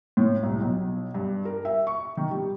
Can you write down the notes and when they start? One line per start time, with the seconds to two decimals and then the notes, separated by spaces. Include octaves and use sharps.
0.17 A2
0.43 C2
0.61 B1
1.14 G2
1.45 A#4
1.65 E5
1.87 C#6
2.17 D#3
2.31 G3